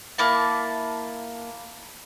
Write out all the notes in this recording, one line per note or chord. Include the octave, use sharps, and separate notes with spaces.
A#3 E4 A5